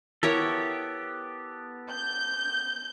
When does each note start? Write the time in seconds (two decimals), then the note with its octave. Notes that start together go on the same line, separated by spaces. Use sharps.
0.23 B3 E4 G4 A4 A#4 C#5
1.91 G6